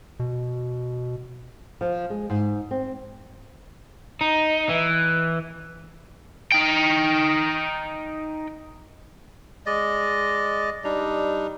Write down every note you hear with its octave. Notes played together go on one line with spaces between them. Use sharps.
B2
F3
G#3
G#2
C4
D#4
E3
D#4 G5
G#3 D5 D#5
G3 D4 D#4